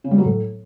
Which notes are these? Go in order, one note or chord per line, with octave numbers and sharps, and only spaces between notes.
C#3
G3
F#3
A2